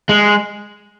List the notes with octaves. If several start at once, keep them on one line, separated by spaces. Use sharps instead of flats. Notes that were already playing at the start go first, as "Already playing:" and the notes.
G#3